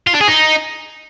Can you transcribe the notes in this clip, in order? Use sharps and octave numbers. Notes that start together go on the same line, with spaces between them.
F4
D4
G#4
D#4